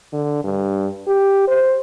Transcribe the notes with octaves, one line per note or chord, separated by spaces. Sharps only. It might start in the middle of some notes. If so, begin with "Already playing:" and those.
D3
G2
G4
C5